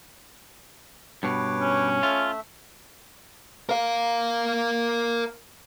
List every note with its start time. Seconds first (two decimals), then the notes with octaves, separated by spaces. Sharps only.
1.23 G2 B2 B4 C#5 D6
1.60 C#4
2.03 A3 F4 E5
3.69 A#4 F5